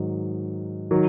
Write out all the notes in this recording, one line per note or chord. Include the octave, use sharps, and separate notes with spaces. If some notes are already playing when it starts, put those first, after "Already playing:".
Already playing: G#2 D#3 F#3
D#3 F#3